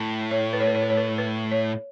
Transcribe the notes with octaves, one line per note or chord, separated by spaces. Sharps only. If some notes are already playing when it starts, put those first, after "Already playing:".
Already playing: A2
C#5
B4
C#5
B4
C#5
B4
C#5
B4
B4
C#5